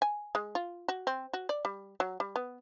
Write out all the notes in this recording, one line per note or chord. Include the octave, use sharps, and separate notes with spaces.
G#5
G#3
F4
F#4
C4
F#4
D5
G3
F#3
G3
B3